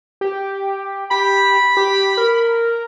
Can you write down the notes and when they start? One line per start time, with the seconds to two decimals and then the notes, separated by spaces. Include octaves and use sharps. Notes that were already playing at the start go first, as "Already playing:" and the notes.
0.21 G4
1.11 G4 B5
1.77 G4
2.17 A#4